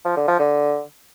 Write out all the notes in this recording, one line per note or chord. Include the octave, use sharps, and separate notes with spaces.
F3
D3
F3
D3